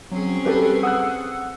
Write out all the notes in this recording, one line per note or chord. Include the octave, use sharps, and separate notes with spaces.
F#3 C4 C#4 G#4
G3 G4 A4 B4
F#5 D#6 E6 F#6